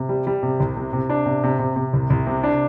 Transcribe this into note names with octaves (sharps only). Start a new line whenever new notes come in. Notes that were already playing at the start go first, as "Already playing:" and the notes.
Already playing: C3
G3
G3
C3
C2
C3
C3
D4
C3
C3
C3
C3
C2
C2
C3
D4